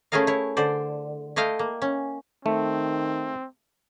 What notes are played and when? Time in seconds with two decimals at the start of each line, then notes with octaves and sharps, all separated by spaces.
0.12 A3 C#4 E4 G#4 A#4 F5
0.27 E4 C#5
0.57 D3 C5 D5
1.36 A3 E4 D#5 F5 G5
1.59 A#3
1.82 C#4
2.46 D#3 A3 C4